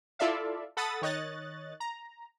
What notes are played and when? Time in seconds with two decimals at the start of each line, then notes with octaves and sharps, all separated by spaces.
0.19 E4 F4 A4 D5 E5 F5
0.77 A4 F#5 B5 D#6 A6
1.02 D#3 C#5 D#5 F#6 A6
1.80 A#5